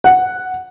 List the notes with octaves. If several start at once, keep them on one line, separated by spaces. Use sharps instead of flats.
F#5